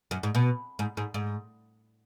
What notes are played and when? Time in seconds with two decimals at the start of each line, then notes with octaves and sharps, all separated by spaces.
0.11 F#2
0.23 G#2
0.35 B2
0.79 G#2
0.97 G#2
1.14 G#2